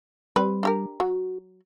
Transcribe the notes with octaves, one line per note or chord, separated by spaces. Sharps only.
G3 C4 B4
D4 G4 A#4
F#3 F#4